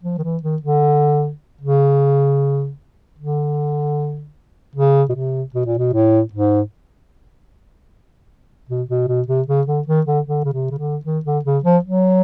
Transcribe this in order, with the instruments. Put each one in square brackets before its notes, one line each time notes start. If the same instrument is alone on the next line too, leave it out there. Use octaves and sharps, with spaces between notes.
[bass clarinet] F3
D#3
E3
D#3
D3
C#3
D3
C#3
B2
C3
B2
A#2
B2
A2
G#2
B2
B2
B2
C3
C#3
D3
D#3
D3
D3
C#3
C3
C#3
D3
D#3
D3
C#3
F3
F#3